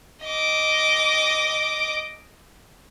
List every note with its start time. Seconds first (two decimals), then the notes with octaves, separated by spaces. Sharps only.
0.25 D#5 D6